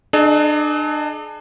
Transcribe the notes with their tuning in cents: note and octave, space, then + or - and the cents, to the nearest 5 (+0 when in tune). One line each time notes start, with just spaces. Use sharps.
D4 +35 G#4 +45 D#5 +0